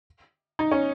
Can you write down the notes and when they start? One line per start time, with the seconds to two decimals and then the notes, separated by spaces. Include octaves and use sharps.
0.59 D#4
0.71 C#4